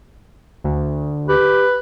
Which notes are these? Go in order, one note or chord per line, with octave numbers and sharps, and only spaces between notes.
D2
G4 B4